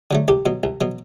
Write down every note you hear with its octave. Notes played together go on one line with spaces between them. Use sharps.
D3 F#3 A3
C2 G4
B2 F#3
C2
B2 F#3